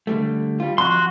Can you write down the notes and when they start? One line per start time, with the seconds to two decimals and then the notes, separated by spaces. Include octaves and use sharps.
0.07 D3 G3 A3
0.60 G3 F4
0.78 F2 F#4 C6